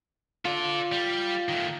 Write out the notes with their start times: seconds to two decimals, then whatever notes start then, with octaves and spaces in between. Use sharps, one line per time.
0.45 F4 A4 D5
0.92 G3
1.49 D#3 A3